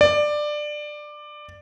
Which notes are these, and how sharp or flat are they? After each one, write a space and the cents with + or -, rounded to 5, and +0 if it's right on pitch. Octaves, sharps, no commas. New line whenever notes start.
D5 +15